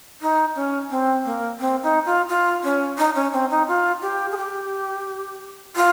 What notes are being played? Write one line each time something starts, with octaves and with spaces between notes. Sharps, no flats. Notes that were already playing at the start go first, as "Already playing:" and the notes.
D#4
C#4
C4
A#3
C4
D#4
F4
F4
C#4
D#4
C#4
C4
D#4
F4
G4
G#4
G4
F4